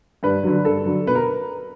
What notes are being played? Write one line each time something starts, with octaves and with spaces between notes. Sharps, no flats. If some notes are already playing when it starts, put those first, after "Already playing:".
G2 B4
D3 F#3
G2 A4
D3 F#3
B2 B4
A#4